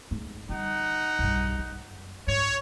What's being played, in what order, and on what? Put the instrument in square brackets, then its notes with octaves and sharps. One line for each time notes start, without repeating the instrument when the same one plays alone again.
[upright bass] G#2
[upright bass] D3 G3 [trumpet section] D#4 F#5
[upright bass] B1 G2
F#2
[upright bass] G#2 [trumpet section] C#5